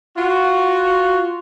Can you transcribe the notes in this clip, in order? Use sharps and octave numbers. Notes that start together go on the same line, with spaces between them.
F4 F#4